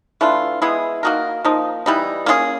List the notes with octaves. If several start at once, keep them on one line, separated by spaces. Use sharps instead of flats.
E3 A3 D4 F4
G#3 B3 E4 G#4
A#3 D#4 F#4 A#4
F3 A#3 D#4
E3 G3 B3 D#4
A#3 C#4 F4 G#4